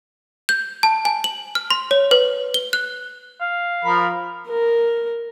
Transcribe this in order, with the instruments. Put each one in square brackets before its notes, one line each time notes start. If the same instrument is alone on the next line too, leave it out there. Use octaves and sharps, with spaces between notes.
[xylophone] G6
A5
G#5
F#7
F6
C6
C#5
B4
G7
F#6
[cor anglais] F5
[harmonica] F3 A#4 B5
[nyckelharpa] A#4